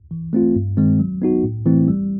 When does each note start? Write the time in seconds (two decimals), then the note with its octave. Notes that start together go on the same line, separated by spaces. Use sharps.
0.11 E3
0.33 A3 C4 F4
0.56 G2
0.77 D#3 G#3 C4
0.99 F#3
1.22 B3 D#4 F#4
1.43 A2
1.66 E3 A3 C4 E4
1.88 G3